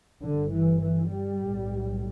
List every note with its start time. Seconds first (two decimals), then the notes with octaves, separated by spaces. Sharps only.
0.22 G1 G2 D3
0.51 E3
0.81 E3
1.10 G3
1.39 B1 A2